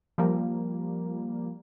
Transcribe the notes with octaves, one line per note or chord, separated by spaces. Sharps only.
F3 G3 A#3